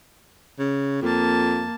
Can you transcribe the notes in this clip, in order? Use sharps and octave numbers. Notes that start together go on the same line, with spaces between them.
C#3
F2 A#3 A5